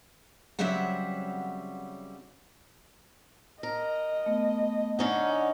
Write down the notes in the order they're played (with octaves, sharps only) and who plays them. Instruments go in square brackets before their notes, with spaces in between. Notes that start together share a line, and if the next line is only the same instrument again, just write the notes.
[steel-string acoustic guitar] C#3 F#3 G3 C4 E5 F#5
[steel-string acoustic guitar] A#4 [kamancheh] D#5
[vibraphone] A3 B3
[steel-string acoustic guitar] D3 C#4 D#4 [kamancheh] F#5